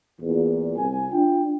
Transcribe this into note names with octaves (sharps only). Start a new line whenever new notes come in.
E2 A#2
C2 G#5
D4 F4 G5